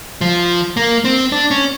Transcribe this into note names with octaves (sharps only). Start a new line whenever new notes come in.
F3
A#3
C4
D4
C#4